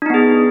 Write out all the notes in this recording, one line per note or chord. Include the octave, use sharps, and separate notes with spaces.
B3 D4 D#4 G#4